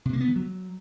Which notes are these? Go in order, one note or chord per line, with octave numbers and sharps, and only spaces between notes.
C3
A#3
B3
D#3
F#3